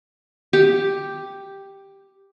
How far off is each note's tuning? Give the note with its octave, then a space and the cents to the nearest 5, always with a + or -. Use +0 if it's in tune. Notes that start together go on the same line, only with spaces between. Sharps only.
G4 +0